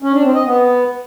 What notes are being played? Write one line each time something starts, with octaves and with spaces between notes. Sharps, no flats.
C#4
D4
C4
D#5
B3